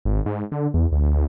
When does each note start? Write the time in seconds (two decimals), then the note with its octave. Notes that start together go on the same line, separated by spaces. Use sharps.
0.05 G#1
0.26 G#2
0.52 D3
0.74 E2
0.92 D2